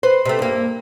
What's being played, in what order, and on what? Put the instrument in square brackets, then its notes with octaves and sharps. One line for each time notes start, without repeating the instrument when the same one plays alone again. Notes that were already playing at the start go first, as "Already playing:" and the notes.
[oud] B4 [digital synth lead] C5
[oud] C3 A3
G2 A#3